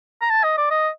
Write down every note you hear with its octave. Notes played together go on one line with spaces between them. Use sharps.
A#5
A5
D#5
D5
D#5